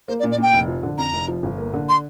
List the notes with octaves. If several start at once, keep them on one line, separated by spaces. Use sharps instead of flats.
A#3 C5
D5
A#2
D5
A#2 G5
F1
F3
D3
F2 A#5
F1
F3
G1
A#3
D3
C6